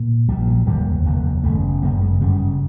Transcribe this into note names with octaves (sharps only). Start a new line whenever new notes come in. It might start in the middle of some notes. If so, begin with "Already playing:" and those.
Already playing: A#2
A#1 A#2 G3
F#3
F1 D#2 D3 G3
F1 D#2 D3
G1 F#2 C#3 A3
G1 F#2 C#3 A#3
G#3
G1 F#2 C#3 G3